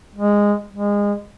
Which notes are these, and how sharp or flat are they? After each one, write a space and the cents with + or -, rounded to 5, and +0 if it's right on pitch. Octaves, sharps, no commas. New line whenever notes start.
G#3 -15
G#3 -25